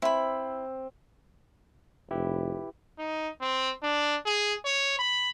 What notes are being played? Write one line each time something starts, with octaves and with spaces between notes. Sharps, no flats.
C4 E4 B5
F1 E4 G4 B4
D#4
C4
D4
G#4
C#5
B5